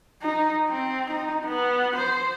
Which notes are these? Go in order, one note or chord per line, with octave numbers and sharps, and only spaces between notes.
D#4
C4
D#4
B3
C5